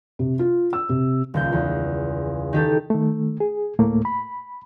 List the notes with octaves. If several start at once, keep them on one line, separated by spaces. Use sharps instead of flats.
C3
F4
E6
C3
D#1 C#2 G6
E2
D#3 G4 A4
D#3 A3
G#4
D2 A2 A3 A#3
B5